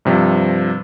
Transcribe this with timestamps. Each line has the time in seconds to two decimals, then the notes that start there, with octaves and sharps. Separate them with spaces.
0.05 G2 C3 F3